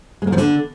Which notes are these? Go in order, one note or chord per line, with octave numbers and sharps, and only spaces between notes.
G#3
A#3
F3
D3